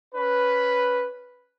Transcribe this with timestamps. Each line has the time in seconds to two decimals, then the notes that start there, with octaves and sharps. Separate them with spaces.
0.14 C#4 B4